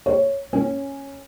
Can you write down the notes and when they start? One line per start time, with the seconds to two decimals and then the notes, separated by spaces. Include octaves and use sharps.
0.06 C#5
0.53 C#4